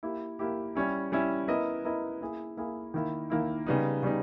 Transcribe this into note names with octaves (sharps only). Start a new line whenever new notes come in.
A#3 E4 G4
A#3 E4 G4
G3 C#4 E4
G3 C#4 E4
B3 E4 A#4 D#5
B3 E4 A#4 D#5
A#3 E4 G#4
A#3 E4 G#4
D#3 A#3 E4
D#3 A#3 E4
C#3 G3 B3 D#4
C#3 G3 B3 D#4